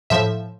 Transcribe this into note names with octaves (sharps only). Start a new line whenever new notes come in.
A2 F3 E5